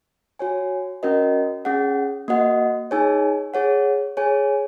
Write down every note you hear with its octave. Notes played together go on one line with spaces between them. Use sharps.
F#4 C#5 G#5
C#4 F#4 A#4 D#5
C#4 G#4 F#5
A#3 F#4 D#5 F#5
D#4 G#4 C#5 G#5
G#4 C#5 F#5
G#4 C#5 G#5